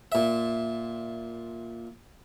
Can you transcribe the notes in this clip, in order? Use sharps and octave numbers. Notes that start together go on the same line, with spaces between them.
A#2 E5